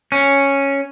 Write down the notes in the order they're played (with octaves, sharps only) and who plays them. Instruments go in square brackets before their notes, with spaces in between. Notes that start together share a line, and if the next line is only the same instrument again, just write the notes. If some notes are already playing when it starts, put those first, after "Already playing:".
[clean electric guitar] C#4